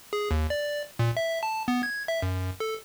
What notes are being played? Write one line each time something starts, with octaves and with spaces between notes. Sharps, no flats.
G#4
D#2
D5
A#2
E5
A5
B3
G#6
E5
F#2
A4